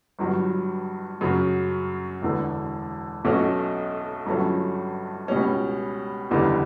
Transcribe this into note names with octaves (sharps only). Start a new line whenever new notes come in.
G1 G2 F#3
F#2 C#3 F#3
E1 E2 D3
B1 B2 A3 C#4 F#4
G1 G2 F#3 A3 C#4
C#2 B2 G3 C#4
F#1 E2 D3 G3